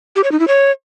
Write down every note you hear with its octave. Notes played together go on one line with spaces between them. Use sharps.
G4
C#5
D#4
E4
C#5